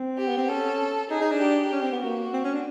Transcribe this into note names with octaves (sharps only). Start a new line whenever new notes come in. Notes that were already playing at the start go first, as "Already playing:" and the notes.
Already playing: C4
G4
B3
C4
C#4 A4
D#4 G#4
D#4
D4
G4
C#4
C4
B3
A#3 F#4
C4
C#4
D4